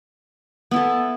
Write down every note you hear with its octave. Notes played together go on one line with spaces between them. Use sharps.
B3 E4 A4